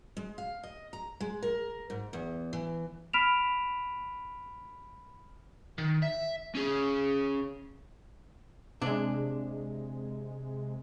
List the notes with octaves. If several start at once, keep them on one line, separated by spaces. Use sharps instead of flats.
G#3
F5
D#5
A#5
G#3
A#4
G#2
E2
E3
B5 F6 B6 D7 E7 F7
D#3
E5
C#4 G#4
C3 G#3 D4